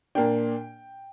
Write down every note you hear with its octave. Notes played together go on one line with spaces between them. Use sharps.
A#2 A#3 D4 G5